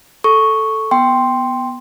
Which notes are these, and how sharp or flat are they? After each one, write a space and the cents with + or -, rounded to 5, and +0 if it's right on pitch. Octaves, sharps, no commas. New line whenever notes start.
A4 +0 C#6 +0
B3 -5 G5 +0 C6 +0